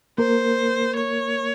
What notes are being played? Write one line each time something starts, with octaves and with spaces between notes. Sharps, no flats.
A#3 A#4 C5
C#5